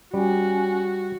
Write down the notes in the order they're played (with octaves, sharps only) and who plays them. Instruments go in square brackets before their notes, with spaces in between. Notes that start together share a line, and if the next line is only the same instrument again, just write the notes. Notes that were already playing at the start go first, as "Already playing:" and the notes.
[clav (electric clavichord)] G3 [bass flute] C#4 [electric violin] F#4